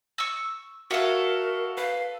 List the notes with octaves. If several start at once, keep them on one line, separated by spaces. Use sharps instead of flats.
C#6 E6
F#4 A4 A#4 C#5 E5 F5
B4 F5